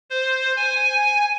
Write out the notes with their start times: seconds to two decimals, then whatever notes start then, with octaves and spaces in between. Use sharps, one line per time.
0.10 C5
0.56 G#5